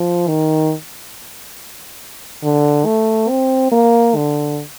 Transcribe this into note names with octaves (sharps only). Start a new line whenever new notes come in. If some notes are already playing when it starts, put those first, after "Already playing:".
Already playing: F3
D#3
D3
A3
C4
A#3
D3